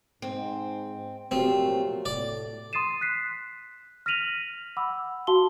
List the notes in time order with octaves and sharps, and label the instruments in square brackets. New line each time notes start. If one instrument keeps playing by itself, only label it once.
[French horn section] G#2 [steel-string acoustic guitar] C4
[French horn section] A#2 G4 [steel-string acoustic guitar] F3 F#3 A3 [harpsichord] C4
[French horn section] A2 [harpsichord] D5
[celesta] C6 D#6 A6 C7 D#7 E7
F#6 B6 C7
F6 A#6 B6 D#7 F7 F#7
F#5 B5 D6 E6
F#4 F5 A5 C6 G7